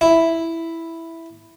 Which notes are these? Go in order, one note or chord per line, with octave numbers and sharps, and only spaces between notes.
E4